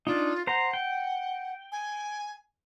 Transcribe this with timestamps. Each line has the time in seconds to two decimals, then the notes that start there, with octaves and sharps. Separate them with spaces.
0.07 D4 D#4 F4
0.47 C5 F#5 A#5
0.73 G5
1.72 G#5